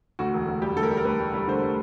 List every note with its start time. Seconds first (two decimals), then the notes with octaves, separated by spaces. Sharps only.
0.19 D2 F#4
0.33 E1
0.48 D2
0.62 G3 G4
0.76 D2 A4
0.83 A#4
0.90 G3
0.97 A#4
1.05 D2 B4
1.20 G3
1.34 G3
1.47 D3 C5
1.62 G3